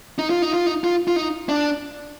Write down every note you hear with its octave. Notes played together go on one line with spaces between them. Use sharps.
D#4
F4
D#4
F4
D#4
F4
F4
D#4
D4